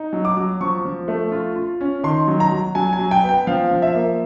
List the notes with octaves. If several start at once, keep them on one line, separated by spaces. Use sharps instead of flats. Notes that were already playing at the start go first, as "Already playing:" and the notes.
Already playing: D#4
F#3
D6
F#3
F3 C#6
F3
A3
F4
F4
C#4
D#3 C6
F#3
A#5
F#3
F#3 G#5
G#5
F#3
G5
B3
G5
F3 F5
F3
E5
A#3